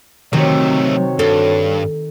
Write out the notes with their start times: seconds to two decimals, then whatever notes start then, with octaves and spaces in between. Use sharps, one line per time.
0.33 C3 D#3 F#3 A3 C4 F#4 C#5
1.19 G2 A4